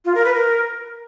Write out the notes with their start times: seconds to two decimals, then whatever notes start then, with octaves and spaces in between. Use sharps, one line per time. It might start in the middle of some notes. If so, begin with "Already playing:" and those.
0.05 F4
0.15 A#4
0.25 B4
0.34 A#4